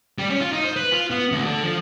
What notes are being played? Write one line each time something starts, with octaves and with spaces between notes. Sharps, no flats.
G3
C#4
F4
D#4
C5
B4
F4
B3
D2
D3
F3